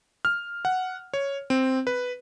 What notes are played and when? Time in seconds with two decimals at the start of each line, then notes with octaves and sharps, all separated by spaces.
0.25 F6
0.65 F#5
1.14 C#5
1.50 C4
1.87 B4